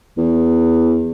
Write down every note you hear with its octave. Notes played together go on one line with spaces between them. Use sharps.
E2